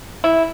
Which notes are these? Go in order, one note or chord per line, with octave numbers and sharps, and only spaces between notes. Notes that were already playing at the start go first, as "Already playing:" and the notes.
E4